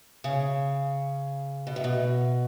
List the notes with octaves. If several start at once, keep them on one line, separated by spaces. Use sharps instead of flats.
C#3
B2
A2
B2